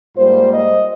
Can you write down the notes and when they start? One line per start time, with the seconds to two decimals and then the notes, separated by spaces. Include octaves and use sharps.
0.16 G#2 G3 A#3 F4 C5
0.52 D#5